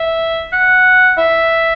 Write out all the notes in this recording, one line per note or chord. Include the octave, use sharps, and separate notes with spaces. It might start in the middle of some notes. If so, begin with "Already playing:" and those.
Already playing: E5
F#5
E5